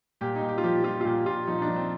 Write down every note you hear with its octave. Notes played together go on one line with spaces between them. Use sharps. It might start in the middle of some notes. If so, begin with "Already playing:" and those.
A#2 G4
D#4
A#2
G4
F4
F3 G4
F3 F4
F4
A#2 G4
A#2 F4
F3 D#4
D#4
D4
F3
C4